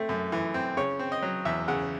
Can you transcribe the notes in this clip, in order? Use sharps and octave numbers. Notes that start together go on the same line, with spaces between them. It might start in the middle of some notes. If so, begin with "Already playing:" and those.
Already playing: A3 C4
F#2
E3
C4
C#3 C#5
C4
D#5
F#3
E2 E5
C#3 F#5